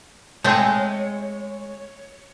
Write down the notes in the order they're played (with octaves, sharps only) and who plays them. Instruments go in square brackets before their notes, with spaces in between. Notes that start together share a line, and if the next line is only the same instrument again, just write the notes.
[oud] G#3 G#4 [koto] A3 C4 [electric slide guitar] C#5